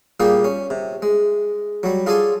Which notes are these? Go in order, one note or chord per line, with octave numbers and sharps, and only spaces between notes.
A#2 G3 A#3 G4 G#4 G5
C#4
C3
G#3
F#3 G3
F4 G#4 A4 D5 G#5 C6